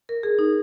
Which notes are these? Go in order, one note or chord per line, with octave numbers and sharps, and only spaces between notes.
A#4
G#4
D#4